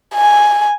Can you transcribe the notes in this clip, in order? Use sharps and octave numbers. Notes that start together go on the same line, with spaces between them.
G#5